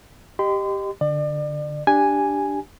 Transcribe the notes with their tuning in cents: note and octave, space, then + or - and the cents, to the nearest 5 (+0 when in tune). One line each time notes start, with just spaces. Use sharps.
G4 +0 D#5 -20 C6 -35
D3 +0 D5 +35
D4 +0 G4 +0 G#5 +0